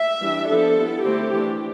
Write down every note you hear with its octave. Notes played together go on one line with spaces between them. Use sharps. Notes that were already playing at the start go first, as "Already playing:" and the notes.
Already playing: E5
E3 G3 D4
F3 B3 D4 A4
G3 B3 E4
D3 A3 C4 E4 G4
E3 A3 D4